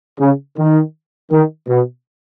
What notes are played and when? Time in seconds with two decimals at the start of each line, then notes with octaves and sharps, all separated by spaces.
0.19 C#3
0.57 D#3
1.31 D#3
1.69 B2